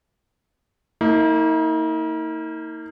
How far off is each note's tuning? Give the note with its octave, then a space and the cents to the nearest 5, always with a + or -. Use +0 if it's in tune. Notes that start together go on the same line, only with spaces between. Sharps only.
A#3 -25 D#4 +45